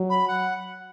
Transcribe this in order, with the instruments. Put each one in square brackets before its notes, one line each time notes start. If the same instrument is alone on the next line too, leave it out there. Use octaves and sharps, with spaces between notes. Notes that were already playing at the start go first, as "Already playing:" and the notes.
Already playing: [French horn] F#3
[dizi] B5
F#5